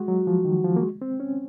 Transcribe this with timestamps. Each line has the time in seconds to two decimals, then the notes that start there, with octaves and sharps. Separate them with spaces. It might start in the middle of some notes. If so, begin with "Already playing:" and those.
Already playing: G#3 F#4
0.08 F#3
0.27 F3
0.45 D#3
0.64 F3
0.76 A#3
0.82 G#3
1.02 C4
1.20 C#4